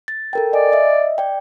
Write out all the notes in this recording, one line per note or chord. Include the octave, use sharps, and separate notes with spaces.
A6
A4 A#4 G5
D5 D#5 G#5
D#5 E5
D5 G5